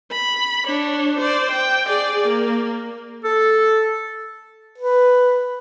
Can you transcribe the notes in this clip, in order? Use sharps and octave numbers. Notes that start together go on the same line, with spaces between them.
B5
D4 C#5
C5 D5
G5
G#4 D5
A#3
A4
B4